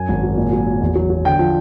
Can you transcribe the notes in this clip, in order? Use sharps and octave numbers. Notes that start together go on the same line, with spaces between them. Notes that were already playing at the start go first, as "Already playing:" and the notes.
Already playing: F#2 G#5
G#1
F#3
A#2
F#3
F#3
E2
F#3
F#3
D3 G5
F3